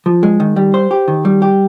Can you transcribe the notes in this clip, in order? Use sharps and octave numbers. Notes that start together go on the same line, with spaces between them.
F3
G#3
D#3
G3
C5
G4
D#3
G3
G4